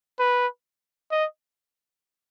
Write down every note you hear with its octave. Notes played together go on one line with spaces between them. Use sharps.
B4
D#5